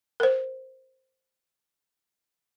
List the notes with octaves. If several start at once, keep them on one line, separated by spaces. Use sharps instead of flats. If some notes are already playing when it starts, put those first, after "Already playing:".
A#4 C5